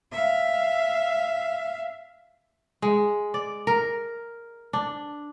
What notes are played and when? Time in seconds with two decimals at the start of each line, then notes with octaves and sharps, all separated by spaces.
0.12 E5 F5
2.82 G#3
3.34 D5
3.67 A#4
4.73 D4